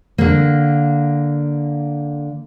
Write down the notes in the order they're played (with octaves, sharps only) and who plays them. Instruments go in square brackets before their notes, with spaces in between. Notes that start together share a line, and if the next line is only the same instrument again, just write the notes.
[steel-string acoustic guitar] D3 A#3